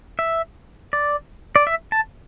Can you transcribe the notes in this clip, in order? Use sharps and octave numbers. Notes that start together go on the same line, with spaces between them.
E5
D5
D5
E5
A5